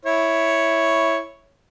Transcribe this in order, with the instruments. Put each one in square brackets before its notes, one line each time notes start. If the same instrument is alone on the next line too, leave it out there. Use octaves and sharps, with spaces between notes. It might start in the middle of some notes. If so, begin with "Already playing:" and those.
[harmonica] E4 C#5